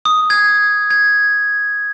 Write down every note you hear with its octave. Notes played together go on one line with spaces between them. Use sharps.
D#6
G#6
G#6